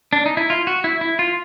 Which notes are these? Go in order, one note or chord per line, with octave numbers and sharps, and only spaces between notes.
D4
D#4
E4
F4
F#4
E4
E4
F4